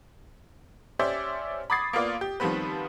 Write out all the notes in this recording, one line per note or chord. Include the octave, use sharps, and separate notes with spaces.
C#4 G4 C5 D5 E5
B5 D6 D#6 G#6 A6 C7
A#3 B3 F4 D5
G4
D#3 F3 G3 B3 C4 B4